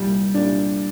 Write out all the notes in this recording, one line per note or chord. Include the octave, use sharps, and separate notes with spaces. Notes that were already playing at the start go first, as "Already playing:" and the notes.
Already playing: C2 A#2 G3
C2 A#2 D4